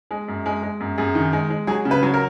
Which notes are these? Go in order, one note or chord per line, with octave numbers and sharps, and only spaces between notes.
G#3
F#2
G#3
G#3
F#2
F#2 G#4
D#3
G#3
G#3
F#3 G#4
C#3
B4
F#3
A#4